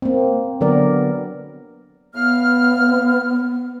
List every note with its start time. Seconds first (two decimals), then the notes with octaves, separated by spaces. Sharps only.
0.02 A#3 C4
0.61 D3 F#3 B3 A#4 D5
2.14 A2 B3 F5 F6